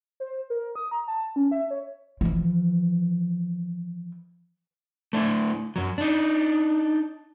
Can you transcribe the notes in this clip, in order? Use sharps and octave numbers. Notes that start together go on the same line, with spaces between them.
C5
A#4
D#6
A#5
A5
C#4
E5
C#5
E3 F3
A3 D4 E4
F#2 F#3
D4 D#4